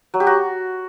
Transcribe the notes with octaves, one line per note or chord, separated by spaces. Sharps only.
F#3
G4
F#4